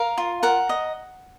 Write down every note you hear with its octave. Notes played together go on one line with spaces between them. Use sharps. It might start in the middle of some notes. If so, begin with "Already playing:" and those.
Already playing: A#4 F5
F4
A#4 F#5
D#5